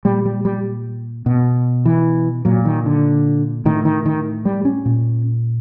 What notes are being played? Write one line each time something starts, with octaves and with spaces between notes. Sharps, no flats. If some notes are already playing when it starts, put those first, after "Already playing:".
A#2 G3
G3
G3
B2
E3
A#2 F#3
D#3
D3
A2 D#3
D#3
D#3
G3
C#4
A#2